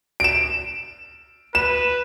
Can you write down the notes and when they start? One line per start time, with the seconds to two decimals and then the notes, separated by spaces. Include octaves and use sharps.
0.20 D7 E7
1.55 B4 E7